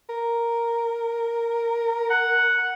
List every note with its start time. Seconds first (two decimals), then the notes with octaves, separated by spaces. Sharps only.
0.09 A#4
2.10 F#5